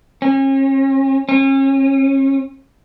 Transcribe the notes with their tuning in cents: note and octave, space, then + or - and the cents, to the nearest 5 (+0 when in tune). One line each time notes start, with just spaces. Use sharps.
C#4 -40
C#4 -35